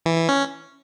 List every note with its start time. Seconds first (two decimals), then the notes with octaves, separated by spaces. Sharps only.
0.06 E3
0.17 E3
0.29 C#4